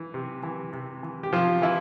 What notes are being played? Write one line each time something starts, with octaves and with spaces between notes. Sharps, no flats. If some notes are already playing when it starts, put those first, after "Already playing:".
Already playing: E3
C3
E3
C3
E3
G4
C3 F3 F4
E3 E4